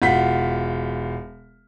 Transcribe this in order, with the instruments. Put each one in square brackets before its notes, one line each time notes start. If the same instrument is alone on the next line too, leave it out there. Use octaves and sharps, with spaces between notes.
[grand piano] E1 F4 F#5 B6